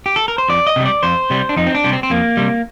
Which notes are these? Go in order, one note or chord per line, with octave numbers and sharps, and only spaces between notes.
G4
A4
A#4
C5
F2 D5
D#5
C3 G3
D5
F2 C5
C3 G3
D4
F2 D#4
C4
D4
C3 G3
C4
C4
F2 A#3
C3 G3